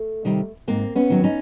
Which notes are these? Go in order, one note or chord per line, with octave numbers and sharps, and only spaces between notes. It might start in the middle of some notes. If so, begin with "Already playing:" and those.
Already playing: A3
C3 D#3 G3
G#2 A#3 C4
B3 C#4
D#3 F#3
C#4 D#4